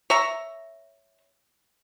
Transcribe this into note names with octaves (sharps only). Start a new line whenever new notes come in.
C#5 E5 A#5